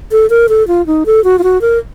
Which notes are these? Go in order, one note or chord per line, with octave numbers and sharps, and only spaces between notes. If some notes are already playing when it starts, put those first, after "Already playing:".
A4
A#4
A4
F4
D#4
A4
F#4
F4
F#4
A#4